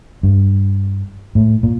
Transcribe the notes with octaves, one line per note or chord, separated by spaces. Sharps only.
G2
A2
A#2